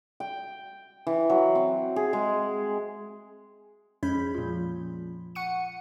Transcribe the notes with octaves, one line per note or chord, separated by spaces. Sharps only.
G5
E3
F#3
C4
G#4
G#3
F2 G#3 C#4 B5 G6
A#2 F3
F#5 C#6 C#7 D#7